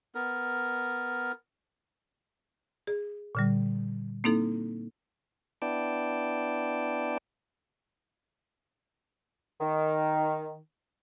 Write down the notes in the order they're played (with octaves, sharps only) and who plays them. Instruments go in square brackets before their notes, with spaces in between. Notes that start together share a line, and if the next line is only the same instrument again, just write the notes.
[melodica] B3 A#4
[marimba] G#4
A#2 D3 G3
A#3 C4 D#4 E4 A4
[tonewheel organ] B3 D4 E4 D5 G5 A5
[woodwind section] D#3